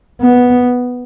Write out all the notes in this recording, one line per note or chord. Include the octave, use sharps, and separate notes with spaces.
B3